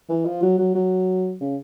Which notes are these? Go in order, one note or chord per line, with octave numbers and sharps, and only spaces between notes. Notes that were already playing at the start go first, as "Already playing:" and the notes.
E3
F3
F#3
F#3
F#3
C#3